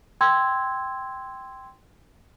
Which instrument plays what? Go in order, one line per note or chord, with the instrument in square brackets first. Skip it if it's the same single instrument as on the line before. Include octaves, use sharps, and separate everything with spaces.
[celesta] G5 C6 E6 G#6